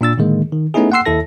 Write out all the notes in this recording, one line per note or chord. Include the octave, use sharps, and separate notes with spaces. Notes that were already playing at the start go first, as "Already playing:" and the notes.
A#2 D4 E6 A6
A2 D3 D#3 G#3 A#3
D#3
A3 B3 C#4 D#4 E4 G#4
A#3 F#5 G5 C6 E6 C7
D#2 E4 A4 A#6